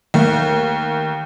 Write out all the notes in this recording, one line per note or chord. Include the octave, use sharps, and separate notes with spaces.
D#2 A3